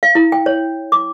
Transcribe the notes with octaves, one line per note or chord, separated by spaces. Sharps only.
F5
E4
G5
C#5
D6